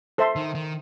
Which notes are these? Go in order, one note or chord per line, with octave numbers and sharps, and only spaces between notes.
A4 C5 E5 A5 C6
D#3
D#3